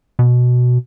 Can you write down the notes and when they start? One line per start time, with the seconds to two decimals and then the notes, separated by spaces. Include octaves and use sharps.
0.19 B2